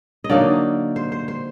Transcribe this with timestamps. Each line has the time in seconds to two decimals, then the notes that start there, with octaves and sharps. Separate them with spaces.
0.24 D#5
0.29 D3 F#3 A#3 D#4 D5
0.96 C5
1.12 C5
1.28 C5